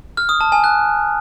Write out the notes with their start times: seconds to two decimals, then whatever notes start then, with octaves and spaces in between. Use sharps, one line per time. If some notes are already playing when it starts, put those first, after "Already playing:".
0.17 F6
0.29 D#6
0.41 A5
0.52 G#5
0.64 F#6